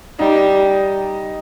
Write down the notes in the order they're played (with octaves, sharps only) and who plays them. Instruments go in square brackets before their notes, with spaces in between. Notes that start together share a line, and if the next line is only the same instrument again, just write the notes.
[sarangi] G3 [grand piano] D#4